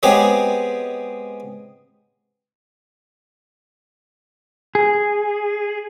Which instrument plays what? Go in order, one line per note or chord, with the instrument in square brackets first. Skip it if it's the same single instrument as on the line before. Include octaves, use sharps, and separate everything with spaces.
[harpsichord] G#3 B3 C4 G4 G#4 C#5
[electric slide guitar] G#4